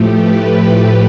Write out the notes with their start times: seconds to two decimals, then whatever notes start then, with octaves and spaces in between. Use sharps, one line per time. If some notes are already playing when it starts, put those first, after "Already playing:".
Already playing: A2 F3 A3 G4
0.11 B4